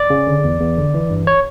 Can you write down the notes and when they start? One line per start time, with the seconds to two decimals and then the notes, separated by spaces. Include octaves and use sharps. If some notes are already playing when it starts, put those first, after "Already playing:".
Already playing: D5
0.10 C#3
0.27 D3
0.44 E2
0.60 E2
0.77 D3
0.94 E3
1.10 G2
1.27 C#5